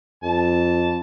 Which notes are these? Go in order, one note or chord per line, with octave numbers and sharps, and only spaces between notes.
F2 A5